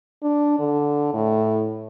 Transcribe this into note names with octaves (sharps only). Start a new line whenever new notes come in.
D4
D3
A2